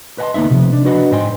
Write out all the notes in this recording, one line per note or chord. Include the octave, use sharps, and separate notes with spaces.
B4 D#5 F#5 G#5 A5 C6
D2 A#3 B3 D#4 E5
C3 E3 F3
D4
D4 F#4 B4 D#5 F#5 B5
G#2 C5 D#5 G5 G#5 C6